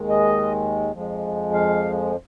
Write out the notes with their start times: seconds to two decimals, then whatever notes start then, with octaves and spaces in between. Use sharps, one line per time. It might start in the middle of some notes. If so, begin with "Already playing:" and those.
Already playing: D#2 D#3 G#3
0.09 D#5
0.92 F2 F3 G#3
1.54 F5